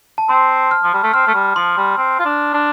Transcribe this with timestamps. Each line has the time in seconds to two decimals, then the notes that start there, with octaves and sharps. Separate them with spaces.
0.18 A5
0.29 C4 C6
0.71 F6
0.83 F3
0.93 G3
1.03 A3
1.13 C4 F6
1.27 A3
1.34 G3
1.55 F3 C6
1.77 G3
1.97 C4
2.19 F4
2.25 D4
2.54 D4